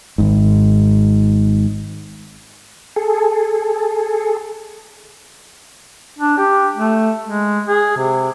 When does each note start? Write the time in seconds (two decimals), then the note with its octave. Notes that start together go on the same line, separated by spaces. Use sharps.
0.18 G#1 G#2
2.96 G#4 A4
6.19 D4
6.38 G4
6.76 A3
7.24 G#3
7.68 G#4
7.97 C3